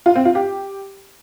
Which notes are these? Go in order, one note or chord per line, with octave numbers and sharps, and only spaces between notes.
F4
C4
F4
G4